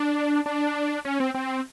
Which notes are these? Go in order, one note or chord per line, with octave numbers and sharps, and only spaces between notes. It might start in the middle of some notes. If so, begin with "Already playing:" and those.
Already playing: D4
D4
C#4
C4
C4